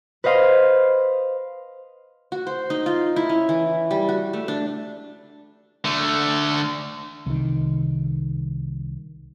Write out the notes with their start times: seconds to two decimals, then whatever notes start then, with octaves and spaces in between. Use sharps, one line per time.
0.24 B4 C5 D#5 F5 C6
2.32 F#4
2.47 C5
2.70 D#4
2.86 F4
3.16 E4
3.29 C#4
3.49 E3
3.91 G3
4.09 F#4
4.33 A3
4.48 D4
5.84 D3 A3
7.26 C2 D#3